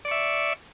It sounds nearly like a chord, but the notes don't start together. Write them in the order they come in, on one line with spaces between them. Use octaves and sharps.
D5 C#6 E5